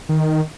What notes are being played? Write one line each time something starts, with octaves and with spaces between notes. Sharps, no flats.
D#3